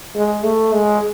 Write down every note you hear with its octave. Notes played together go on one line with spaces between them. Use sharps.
G#3
A3
G#3